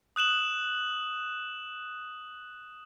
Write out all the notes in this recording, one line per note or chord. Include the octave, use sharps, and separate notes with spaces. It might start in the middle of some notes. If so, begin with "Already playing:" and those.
D#6 F#6 E7 F#7